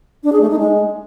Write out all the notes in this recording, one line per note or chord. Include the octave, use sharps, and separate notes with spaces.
D4
G#4
A3
D#4
G#3